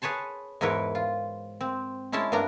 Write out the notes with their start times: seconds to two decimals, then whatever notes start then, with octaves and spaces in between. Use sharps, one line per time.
0.02 G#4 B4 C#5 A5 C6
0.61 E2 G#2 E4 A#4 B4 C#5
0.95 F4
1.61 C4
2.12 G#3 C#4 E4 A5 C6
2.32 G2 B3 D4 A#4 A#5